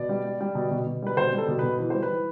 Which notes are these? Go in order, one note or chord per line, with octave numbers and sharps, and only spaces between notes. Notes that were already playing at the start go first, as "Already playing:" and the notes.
Already playing: B2 D5
G3
G3
G3
B2
B2
B2
G3 B4
B2 C5
G3
A4
B2
B2 B4
E3 B4
G3 C5
B4
E3